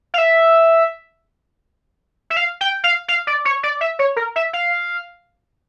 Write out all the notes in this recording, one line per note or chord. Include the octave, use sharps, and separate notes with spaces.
F5
E5
E5
F5
G5
F5
F5
D5
C#5
D5
E5
C#5
A#4
E5
F5